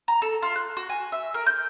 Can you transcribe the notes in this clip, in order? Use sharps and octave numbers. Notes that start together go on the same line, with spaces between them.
A#5
A4
F4
F#6
F#4
G#5
E5
A#4
G6